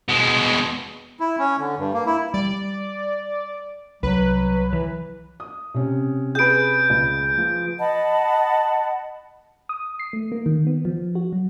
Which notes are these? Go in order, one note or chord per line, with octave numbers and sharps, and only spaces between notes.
B2 G#3
E4
C#4
D3
G2
A#3
E4
G3 D5
C2 F#3 B4
E3
D#6
C3 C#4
G#4 B4 G6 D7
C#2
F3
D#5 F#5 A5 B5
D#6
C7
A3
A#3
D#3
B3
F3
F#4
F#3